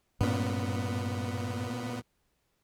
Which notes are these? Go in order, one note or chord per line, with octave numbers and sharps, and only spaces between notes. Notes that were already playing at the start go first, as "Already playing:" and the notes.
G2 A#2 B3 C#4